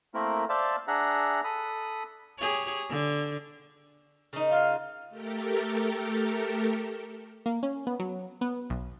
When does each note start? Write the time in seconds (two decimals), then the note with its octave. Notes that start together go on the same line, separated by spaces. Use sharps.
0.14 A3 A#3 C4 E4 A#4
0.49 C5 D5 E5 F5 A5
0.88 D4 G#4 E5 F#5 A#5
1.44 A4 B5 D#6
2.39 G4 G#4 C#5
2.89 D3
4.33 C#3 D#4
4.51 F4 F5
5.09 A3 G4 A4 A#4
7.46 A#3
7.63 C#4
7.87 B3
7.99 F#3
8.41 B3
8.70 B1